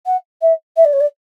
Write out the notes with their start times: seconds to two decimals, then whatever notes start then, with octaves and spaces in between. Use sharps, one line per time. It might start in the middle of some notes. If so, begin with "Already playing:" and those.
0.06 F#5
0.41 E5
0.76 E5
0.85 D5
0.93 C#5
1.00 D5